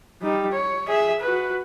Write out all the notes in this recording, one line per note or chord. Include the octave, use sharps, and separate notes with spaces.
G3 D#4
C#5
G#4 E5
F#4 B4